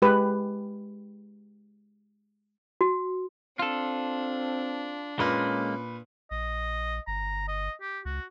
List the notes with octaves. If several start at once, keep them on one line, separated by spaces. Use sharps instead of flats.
G#3 G4 B4
F#4
C4 D4 F4 A4
A#2 G#3 A#3 C#4 B4
A#1 D#5
G1 A#5
D#5
G4
C#2 F#4